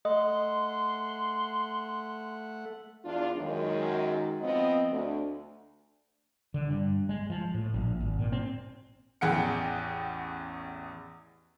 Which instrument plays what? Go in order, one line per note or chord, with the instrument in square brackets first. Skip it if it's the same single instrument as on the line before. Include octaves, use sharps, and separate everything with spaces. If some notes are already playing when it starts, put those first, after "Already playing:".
[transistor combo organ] A3 F#5 [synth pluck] D#5 [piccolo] C6
[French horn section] E2 D4 F4
F#2 D#3 G#3
F3 B3 C4 D#5
D2
[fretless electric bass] D3
G2
G#3
F3
A2
A#1
G#1
A#2
C4
[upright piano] A1 E2 G#4 F#5 G5 C#7